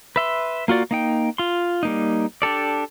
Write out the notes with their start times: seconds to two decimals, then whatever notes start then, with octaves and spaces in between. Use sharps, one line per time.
0.16 B4 E5 C6
0.68 A#3 F4 F#4 D5
0.91 A#3 D#4 G5
1.38 F4 C6
1.83 G3 A#3 D#4
2.42 D4 G4 A4 D5